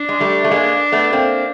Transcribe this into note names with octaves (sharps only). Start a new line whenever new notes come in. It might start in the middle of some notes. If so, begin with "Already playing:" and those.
Already playing: D4
G#3
G3 A3
A3
G#3 A#3
A3 B3
A#3 C4